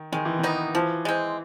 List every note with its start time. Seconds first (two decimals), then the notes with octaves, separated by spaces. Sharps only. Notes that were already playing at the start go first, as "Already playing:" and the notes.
Already playing: D#3
0.12 D#3 G#3
0.25 E3
0.39 D#3 B3 D#4
0.74 E3 F3
1.05 G#3 C4